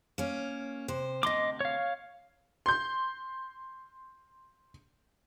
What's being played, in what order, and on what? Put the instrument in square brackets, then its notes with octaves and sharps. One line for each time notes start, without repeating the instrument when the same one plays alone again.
[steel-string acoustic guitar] A#3 C#4
C3 C5
[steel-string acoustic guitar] D2 C3 [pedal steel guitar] D#5 C6 D6
[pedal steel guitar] C#5 F5
[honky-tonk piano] C6 G6